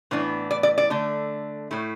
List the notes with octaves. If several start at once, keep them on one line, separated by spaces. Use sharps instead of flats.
A2 E3 B3 D4
D5
D5
D5
D3 A3 D4
A2 A3 E4